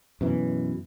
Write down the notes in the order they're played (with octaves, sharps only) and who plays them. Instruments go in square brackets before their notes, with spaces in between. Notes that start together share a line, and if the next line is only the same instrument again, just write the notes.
[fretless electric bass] F#2 B2 E3